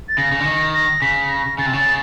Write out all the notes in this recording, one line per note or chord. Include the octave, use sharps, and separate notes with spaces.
A6
C#3 A#6
C#3
D3
D#3
A#6
C#3 B6
A#6
C#3 A6
C3
C#3